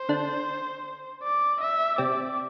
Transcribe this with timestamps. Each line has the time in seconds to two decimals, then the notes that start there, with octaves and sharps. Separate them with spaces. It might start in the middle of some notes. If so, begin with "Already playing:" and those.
Already playing: C5
0.09 D3 D4
1.23 D5
1.61 E5
1.98 C3 C4 D5